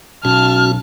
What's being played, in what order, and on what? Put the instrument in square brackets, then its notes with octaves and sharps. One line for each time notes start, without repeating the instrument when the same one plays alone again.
[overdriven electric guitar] B1 [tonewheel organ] C#4 F#4 [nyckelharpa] A5 [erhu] F6